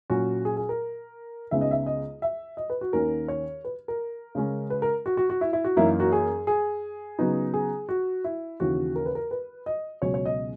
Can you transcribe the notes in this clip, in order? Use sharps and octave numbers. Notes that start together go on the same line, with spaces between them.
A#2 F#3 C#4 F#4
G#4
G#4
A#4
C#2 C#3 G#3 B3 D#4 E5
D#5
E5
D#5
E5
D#5
B4
F#4
D#2 D#3 A#3 C#4 A#4
C#5
B4
A#4
C#3 G#3 C#4
B4
A#4
F#4
F#4
F#4
E4
E4
F#4
F#2 E3 A#3 D#4 E4
F#4
G#4
G#4
C#3 F#3 B3 D#4
G#4
F#4
E4
D#2 C#3 E3 F#4
A#4
B4
A#4
B4
D#5
C#2 B2 F#3 C#4 C#5
C#5
D#5